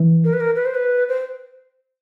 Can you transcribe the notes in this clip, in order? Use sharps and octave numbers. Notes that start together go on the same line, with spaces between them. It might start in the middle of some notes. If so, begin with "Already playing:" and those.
Already playing: E3
A#4
B4
A#4
B4
C5
B4
C5